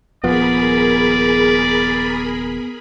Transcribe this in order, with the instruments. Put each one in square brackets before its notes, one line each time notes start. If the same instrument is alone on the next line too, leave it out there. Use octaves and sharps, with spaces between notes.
[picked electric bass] D#1 F3 [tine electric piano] B3 [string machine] G#4 A#4 B5 [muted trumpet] D5